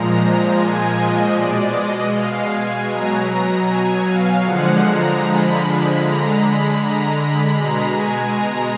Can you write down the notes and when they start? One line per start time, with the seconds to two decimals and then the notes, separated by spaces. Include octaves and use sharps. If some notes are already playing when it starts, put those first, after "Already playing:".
Already playing: A#2 F3 G#3 A#5
0.55 G#5
0.93 D#5
1.32 B2 G#3 D5
1.71 D#5
2.10 F5
2.49 G#5
2.87 B2 F#3 A#5
3.65 G#5
4.04 F5
4.43 D3 F3 G#3 F#5
4.81 A#5
5.20 B5
5.97 D3 G#3 A#5
6.36 B5
6.76 A#5
7.14 B5
7.53 B2 G#3 A#5
7.91 G#5
8.31 A#5